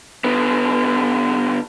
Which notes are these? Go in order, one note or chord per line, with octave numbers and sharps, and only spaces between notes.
D3 B3